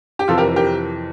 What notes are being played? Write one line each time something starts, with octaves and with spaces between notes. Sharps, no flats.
G4
F2 C3 E3 F4 A4
G4 A#4
G4 A#4